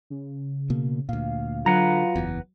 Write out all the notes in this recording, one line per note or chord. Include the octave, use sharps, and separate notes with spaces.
C#3
B2 A#3
D2 A#2 F5
D3 F#3 F4 B4 F#5 A#5
F#1 E2